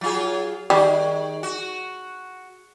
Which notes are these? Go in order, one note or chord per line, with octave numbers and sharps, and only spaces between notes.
F#3 F4 G#4
D#3 G3 G#4
F#4